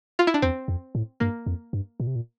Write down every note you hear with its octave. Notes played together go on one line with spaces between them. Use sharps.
F4
E4
D4
E2 C4
F2
A2
G2 A#3
F2
G2
A#2
C3
A#2